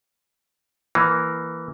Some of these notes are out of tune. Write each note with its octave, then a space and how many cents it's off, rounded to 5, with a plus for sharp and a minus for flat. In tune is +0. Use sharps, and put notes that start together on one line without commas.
E3 +5 A#3 +0